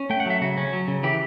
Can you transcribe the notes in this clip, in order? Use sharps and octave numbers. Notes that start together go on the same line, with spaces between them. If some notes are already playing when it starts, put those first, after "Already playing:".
Already playing: C#4
A3 G5
F#5
F#3 E5
C#3 F#4
C#4
F#3
C#3
E3 G4